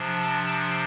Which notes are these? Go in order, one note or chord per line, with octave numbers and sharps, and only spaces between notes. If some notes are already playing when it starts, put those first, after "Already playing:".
Already playing: C3 F3 D4
A5